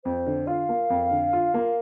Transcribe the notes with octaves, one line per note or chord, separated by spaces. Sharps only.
F2 C5
D3
F4 F5
A#3
F2
D3
F4
A#3